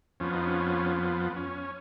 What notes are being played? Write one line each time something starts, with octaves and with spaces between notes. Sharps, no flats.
F2 F3 B3 C#4
D#4
C#4
B3
C#4